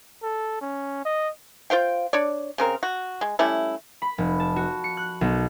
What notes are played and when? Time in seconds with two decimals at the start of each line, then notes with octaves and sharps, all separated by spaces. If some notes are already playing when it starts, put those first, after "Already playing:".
0.22 A4
0.61 C#4
1.05 D#5
1.70 F4 C5 F5 G5
2.13 D4 C#5 D5
2.58 C#3 C4 A#4
2.83 F#4
3.21 G#3
3.39 G3 A3 C#4 E4
4.02 B5
4.18 F1
4.40 A5
4.56 F#4
4.84 C#7
4.97 F#6
5.21 B1